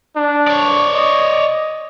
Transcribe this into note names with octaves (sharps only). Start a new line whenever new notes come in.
D4
C#5 D5
D#5